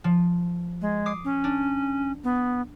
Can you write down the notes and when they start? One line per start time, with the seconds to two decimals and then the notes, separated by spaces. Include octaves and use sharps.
0.04 F3
0.81 G#3
1.06 D6 D#6 C7
1.25 C#4
1.44 D4
2.24 B3